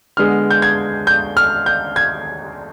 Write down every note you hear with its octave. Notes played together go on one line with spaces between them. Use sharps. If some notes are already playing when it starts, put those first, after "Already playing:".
D3 G#3 B3 F6
G6
G#6
G6
F6
G6
G#6